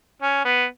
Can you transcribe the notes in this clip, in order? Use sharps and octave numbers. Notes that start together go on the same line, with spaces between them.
C#4
B3